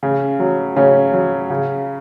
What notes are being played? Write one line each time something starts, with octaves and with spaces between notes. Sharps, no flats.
C#3
F#3
C#3 C#4
F#3
C#3